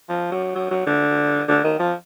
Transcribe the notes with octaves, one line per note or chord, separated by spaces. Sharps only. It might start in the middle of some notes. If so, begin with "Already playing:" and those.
F3
F#3
F#3
F#3
D3
D3
D#3
F3